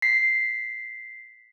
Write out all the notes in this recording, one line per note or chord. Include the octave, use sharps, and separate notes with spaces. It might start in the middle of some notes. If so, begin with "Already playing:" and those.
B6 C7